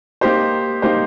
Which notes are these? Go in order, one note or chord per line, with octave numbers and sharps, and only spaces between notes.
A#3 D#4 G4 C5
A#3 D#4 G4 C5